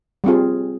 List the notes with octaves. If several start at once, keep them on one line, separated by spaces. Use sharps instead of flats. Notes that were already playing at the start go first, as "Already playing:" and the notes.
G3 C4 F4 G#4